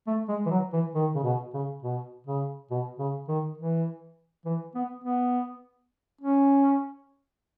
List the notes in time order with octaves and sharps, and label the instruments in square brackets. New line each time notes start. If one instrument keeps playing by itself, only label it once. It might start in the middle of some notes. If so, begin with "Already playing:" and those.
[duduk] A3
G#3
E3
F#3
E3
D#3
C#3
B2
C#3
B2
C#3
B2
C#3
D#3
E3
E3
B3
B3
C#4